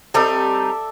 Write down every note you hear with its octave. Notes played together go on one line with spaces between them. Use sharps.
G3 C4 D#4 A4 D5 E5